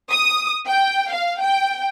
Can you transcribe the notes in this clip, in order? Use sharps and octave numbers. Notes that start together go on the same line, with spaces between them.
D#6
G5
F5
G5